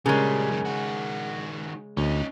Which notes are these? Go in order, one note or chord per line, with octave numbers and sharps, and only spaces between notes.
A#2 C#3 G3 G#3 G#4 A#4 C#5
F#2 D#3
D#3 F#4
D2 C#4 D#4